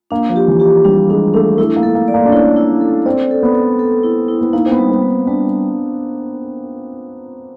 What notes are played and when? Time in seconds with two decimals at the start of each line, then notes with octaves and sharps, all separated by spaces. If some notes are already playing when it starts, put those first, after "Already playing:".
0.11 A#3 D4
0.30 F3
0.36 G4
0.48 E3
0.60 G4
0.84 G3 D4
1.09 G#3 D4
1.34 A3 D4
1.58 A3 E4
1.76 A#3
1.83 A4
1.95 A#3
2.08 D5
2.14 A#3
2.25 D4
2.32 C#4 E4
2.56 E4
2.81 A4
3.06 C4 D5
3.31 A4
3.43 B3
3.55 A4
3.79 A4
4.04 E4
4.28 E4
4.41 B3
4.53 A#3 D#4
4.66 C4
4.71 B3
4.78 G3
4.90 C4
5.03 G3
5.27 G3 D4